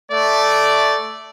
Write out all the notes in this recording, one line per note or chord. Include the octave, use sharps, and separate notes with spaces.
A3 D5